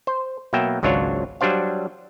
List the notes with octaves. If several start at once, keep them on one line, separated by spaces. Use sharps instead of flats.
C5
B2 F#3 A#3 E5 G5
G#1 C#2 F#3 D4 F4 C#5
F#3 G3 D4 C5 F5